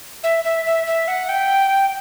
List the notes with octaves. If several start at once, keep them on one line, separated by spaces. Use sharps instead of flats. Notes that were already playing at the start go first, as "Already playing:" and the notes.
E5
E5
E5
E5
F#5
G5